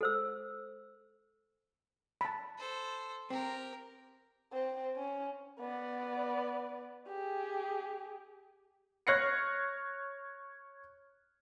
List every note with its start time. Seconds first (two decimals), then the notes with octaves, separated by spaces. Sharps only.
0.01 A4 C5 E6
2.21 A5 B5
2.58 A4 C5
3.30 C4 G4 A#4
4.53 C4
4.97 C#4
5.60 B3 D5
7.08 G4 G#4
9.07 C#5 F6 F#6 A#6 C7 C#7